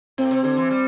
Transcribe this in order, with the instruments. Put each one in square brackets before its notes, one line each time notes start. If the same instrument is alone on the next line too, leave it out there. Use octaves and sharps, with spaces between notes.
[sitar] A2 [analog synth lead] C4
[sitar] C3
D3
E3
G3